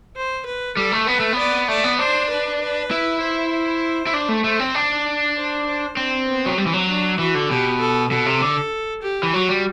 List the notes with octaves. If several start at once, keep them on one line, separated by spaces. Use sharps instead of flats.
C5
B4
G3 A4
A3
B3 B4
A3
B3
D5
A3 D5
B3
D4 C5
B4
B4
E4
C5
E4
D4
A3
A3 C5
C4
D4
C5
C5
C4 D4
B3
F#3
G3 C4
E3
F#3
D4
E3 F#4
D3
B2 G4
A4
B2 A4
C3
D3
G4
E3
F#3 F#4
G3